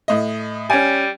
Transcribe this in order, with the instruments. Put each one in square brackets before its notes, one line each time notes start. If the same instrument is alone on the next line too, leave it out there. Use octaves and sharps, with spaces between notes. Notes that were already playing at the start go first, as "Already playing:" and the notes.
[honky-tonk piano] A2 D#5
[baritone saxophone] G3 [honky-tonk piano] C#4 G#5